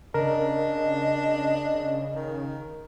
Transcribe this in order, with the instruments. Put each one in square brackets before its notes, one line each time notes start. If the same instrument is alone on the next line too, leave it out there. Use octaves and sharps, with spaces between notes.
[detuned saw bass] C#3 [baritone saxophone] D4 [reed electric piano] A#4 [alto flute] D#5
[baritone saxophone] D#3